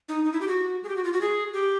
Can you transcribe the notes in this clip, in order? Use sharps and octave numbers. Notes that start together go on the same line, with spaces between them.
D#4
D#4
E4
G4
F#4
G#4
G4
F#4
F4
F#4
G#4
G4